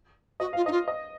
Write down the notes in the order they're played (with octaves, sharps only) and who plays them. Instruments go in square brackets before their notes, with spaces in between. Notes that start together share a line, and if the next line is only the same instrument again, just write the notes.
[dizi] F#4 [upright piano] D#5
[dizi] F4 [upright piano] F5
[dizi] D#4 [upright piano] D#5
[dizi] F4
[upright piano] D#5